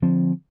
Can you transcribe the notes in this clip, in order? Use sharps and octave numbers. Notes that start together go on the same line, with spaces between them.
D3 F3 C4